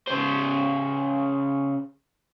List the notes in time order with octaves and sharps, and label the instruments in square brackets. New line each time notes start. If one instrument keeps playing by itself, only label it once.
[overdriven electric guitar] C#3 C5